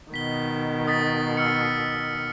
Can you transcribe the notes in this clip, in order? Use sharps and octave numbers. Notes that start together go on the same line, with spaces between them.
B2 D#3 B6 G7
D#6 A6 B6
E6 F6 C#7